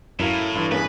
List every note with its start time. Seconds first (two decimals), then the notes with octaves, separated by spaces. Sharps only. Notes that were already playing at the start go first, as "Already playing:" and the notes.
0.20 F#2 A2 E4 A#4 F5
0.55 G2 E3 F4
0.72 A#3 C#4 G#4 B4